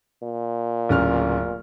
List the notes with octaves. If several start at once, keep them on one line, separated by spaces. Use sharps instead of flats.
A#2
D1 C#3 F6